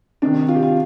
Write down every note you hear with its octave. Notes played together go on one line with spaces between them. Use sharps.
C3 D#3 D4
F4
G4
F4